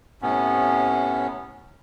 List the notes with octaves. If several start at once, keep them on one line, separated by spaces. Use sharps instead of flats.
A2 C3 B3 C#4